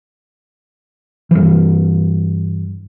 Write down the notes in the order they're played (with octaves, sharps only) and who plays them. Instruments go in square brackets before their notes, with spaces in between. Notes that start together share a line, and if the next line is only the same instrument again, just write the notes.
[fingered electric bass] G2 E3